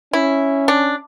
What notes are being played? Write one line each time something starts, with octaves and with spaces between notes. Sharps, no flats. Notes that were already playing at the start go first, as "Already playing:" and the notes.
C#4 E4
D4